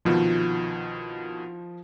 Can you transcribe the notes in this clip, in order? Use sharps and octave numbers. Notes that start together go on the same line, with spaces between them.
C2 B2 D#3 F3